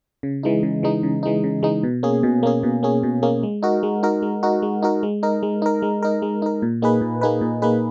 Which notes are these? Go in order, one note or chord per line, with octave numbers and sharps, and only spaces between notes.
C#3
E3 G#3 D#4
C#3
E3 G#3 D#4
C#3
E3 G#3 D#4
C#3
E3 G#3 D#4
B2
A#3 C#4 G#4
B2
A#3 C#4 G#4
B2
A#3 C#4 G#4
B2
A#3 C#4 G#4
G#3
D#4 F#4 A#4
G#3
D#4 F#4 A#4
G#3
D#4 F#4 A#4
G#3
D#4 F#4 A#4
G#3
D#4 A#4
G#3
D#4 A#4
G#3
D#4 A#4
G#3
D#4 A#4
A#2
A#3 D#4 G#4 B4
A#2
A#3 D#4 G#4 B4
A#2
A#3 D#4 G#4 B4